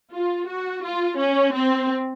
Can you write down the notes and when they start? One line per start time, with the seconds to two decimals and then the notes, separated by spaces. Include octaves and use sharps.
0.12 F4
0.47 F#4
0.82 F4
1.17 C#4
1.53 C4